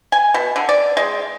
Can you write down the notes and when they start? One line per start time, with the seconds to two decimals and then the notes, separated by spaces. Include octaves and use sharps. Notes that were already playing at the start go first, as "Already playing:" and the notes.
0.12 G#5
0.34 B2
0.56 D3
0.69 D5
0.97 G#3